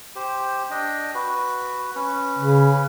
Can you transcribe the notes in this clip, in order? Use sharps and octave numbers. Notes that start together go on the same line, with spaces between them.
G4 C5
D4 D#5 G5
F#4 B4
C#4 B4
C#3